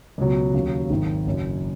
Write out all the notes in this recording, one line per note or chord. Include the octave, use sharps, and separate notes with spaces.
C#2 B2 F#3
D#2 C#3 F#3
G#1 G#2 D#3 F#3
F#1 F#2 F#3